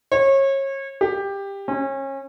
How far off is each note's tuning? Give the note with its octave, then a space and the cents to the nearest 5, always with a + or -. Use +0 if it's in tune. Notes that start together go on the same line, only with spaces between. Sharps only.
C#5 -30
G4 +15
C#4 -30